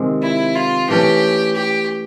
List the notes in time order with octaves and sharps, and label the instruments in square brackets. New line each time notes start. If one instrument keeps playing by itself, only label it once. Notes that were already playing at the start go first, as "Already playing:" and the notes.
Already playing: [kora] C3 D#3 G#3 C4
[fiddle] E4
F4
[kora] E3 A3 C#4 [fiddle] G4
[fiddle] G4